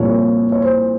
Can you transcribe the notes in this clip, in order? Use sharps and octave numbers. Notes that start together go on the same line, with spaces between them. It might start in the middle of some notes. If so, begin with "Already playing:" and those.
Already playing: C2 A#2 F3 A#3 C#5
C#5
C5